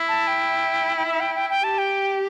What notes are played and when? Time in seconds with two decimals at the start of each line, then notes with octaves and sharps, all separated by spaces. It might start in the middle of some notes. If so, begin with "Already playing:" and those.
Already playing: E4
0.08 A5
0.27 G5
0.97 G5
1.06 E5
1.20 G5
1.35 G5
1.50 G5
1.64 G4 A5
1.78 G5